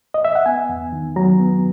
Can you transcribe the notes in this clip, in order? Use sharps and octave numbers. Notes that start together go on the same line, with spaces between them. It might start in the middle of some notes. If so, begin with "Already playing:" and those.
D#5
E5
F#5
B3 G#5
E2
D#3
F#3 A#5
B3